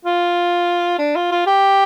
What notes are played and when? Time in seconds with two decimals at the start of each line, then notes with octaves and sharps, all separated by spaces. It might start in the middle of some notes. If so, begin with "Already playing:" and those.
0.05 F4
0.99 D4
1.15 F4
1.31 F4
1.47 G4